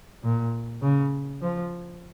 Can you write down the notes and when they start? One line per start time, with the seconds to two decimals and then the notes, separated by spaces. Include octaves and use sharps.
0.24 A#2
0.82 C#3
1.42 F3